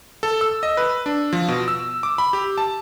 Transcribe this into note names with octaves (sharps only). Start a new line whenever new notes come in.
A4
E6
D#5
B4
D4
F3
B2
E6
D6
B5
G4
A5